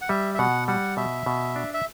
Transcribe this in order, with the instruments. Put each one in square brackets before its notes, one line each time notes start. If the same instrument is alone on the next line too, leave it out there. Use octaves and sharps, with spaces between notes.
[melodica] F#5
[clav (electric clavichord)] G3 [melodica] E5
[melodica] E5
[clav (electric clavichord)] B2 [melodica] F#5
[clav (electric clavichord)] G3 [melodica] F#5
[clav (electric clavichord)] B2 [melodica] E5
[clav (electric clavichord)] B2
D4
[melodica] E5